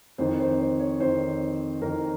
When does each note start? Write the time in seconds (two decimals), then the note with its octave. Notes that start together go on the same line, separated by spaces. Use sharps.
0.18 F2 D#3 C5
0.40 C5
0.60 C5
0.79 C#5
1.00 F2 D#3 C5
1.82 F2 D#3 A#4